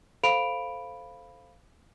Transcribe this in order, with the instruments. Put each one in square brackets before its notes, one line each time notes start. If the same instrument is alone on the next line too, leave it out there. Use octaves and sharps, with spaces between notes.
[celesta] A4 C5 F5 B5 D7 F7